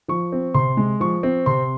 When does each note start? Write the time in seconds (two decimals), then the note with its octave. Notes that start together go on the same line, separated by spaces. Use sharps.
0.08 F3 C#6
0.32 C4
0.54 C3 C6
0.77 G#3
1.00 F3 C#6
1.23 C4
1.46 C3 C6